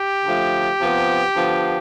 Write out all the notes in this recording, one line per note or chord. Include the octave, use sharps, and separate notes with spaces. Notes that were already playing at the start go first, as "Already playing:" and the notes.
Already playing: G4
D3 F3 A3
C3 F3 B3
D3 F3 B3